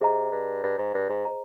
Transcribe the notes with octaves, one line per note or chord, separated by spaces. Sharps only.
C3 G#4 D#5 A#5
G2
G2
G#2
G2
G#2
G#4 C5 D#5 A#5